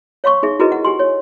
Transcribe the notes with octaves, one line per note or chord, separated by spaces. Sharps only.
C#5 F5 C6 C#6
D#4 G#4 E5
E4 F#4 G#4 A#4 B4 D#5
F#5
G4 G#5 C6
C#5